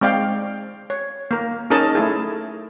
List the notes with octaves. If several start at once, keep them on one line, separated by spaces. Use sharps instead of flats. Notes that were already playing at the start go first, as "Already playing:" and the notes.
G#3 C4 D5 F5 G5
C#5
A#3 A#4
C#4 D#4 G#4 A#4 D#5 A5
A3 E4 G#4